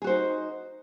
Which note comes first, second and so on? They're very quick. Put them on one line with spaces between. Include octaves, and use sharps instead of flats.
G#4 F#4 C5 D#4